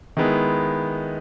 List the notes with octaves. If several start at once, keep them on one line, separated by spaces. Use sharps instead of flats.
D#3 G#3 B3 E4